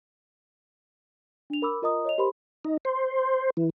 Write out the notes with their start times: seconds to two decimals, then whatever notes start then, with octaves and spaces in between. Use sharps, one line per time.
1.50 D4 F7
1.62 A#4 B5 D6 E6
1.82 F4 A#4 D#5 A#5 D#6
2.05 C#5 D#5 F7
2.18 G4 A#4 C5 B5 C6
2.65 D#4
2.85 C5
3.57 E3